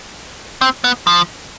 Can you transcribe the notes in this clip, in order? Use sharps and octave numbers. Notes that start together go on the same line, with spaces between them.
C4
B3
F3